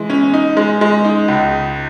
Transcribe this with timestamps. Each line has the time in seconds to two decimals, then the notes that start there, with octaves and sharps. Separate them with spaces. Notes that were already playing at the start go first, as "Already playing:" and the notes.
Already playing: E3 G#3
0.10 C#4
0.34 D#4
0.57 G#3
0.81 G#3
1.04 D#4
1.28 C#2